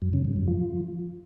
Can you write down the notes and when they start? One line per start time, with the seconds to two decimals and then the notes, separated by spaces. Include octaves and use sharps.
0.02 F#2
0.13 C#3
0.25 G2
0.36 F#2
0.48 F3